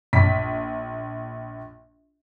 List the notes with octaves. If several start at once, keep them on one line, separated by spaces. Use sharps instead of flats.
A#1 B6